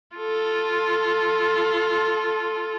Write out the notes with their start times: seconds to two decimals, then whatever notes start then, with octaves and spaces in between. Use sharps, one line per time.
0.16 F4 A4